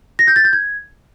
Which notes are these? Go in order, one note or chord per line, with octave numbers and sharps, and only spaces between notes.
A#6
G6
A6
G6
G#6